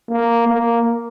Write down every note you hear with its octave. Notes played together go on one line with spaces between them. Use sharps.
A#3
A#3